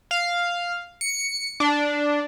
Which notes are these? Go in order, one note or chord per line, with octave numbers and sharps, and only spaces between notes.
F5
C#7
D4